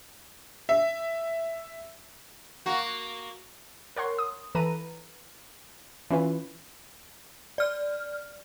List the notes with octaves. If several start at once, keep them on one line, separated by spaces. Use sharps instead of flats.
E5
A#3 F#4
A#4 C#5 F#5 C6
D#6
E3 A4 B4 A#5 D#7
E3 C#4 F4 B4
D5 F6